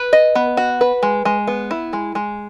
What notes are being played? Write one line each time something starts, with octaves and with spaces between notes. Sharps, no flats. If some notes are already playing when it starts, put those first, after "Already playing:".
Already playing: B4
D#5
B3
F#4
B4
G#3
G#3
B3
E4
G#3
G#3